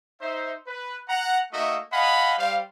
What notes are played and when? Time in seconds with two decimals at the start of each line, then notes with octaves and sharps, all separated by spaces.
0.21 D#4 C5 E5
0.67 B4
1.09 F#5 A#5
1.53 A3 A#3 D#4 F#4 D#5 E5
1.93 D#5 F5 F#5 G#5 B5
2.38 G3 C5 F5